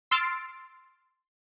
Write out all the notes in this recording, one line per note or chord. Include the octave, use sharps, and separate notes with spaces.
C6 E6 F6 A6 C7 D7